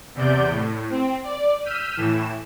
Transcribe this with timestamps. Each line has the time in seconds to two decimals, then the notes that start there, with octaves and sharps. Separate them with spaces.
0.15 E2 C3 D5 G6
0.49 A2
0.90 C4
1.24 D5
1.63 E6 F6 G6 B6 D#7
1.97 A2 E3 E7